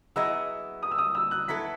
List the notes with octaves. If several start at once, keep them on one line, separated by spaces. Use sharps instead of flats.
F#3 B3 E4 G#4 D#5 E6
D#6
E6
D#6
E6
F#6
F#3 B3 E4 A4 B6